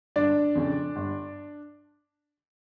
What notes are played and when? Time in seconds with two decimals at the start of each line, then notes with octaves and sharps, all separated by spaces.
0.16 G1 D4 D5
0.56 F2 C#3
0.96 G1